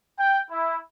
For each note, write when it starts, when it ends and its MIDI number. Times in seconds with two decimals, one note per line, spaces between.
0.19 0.40 79
0.50 0.77 64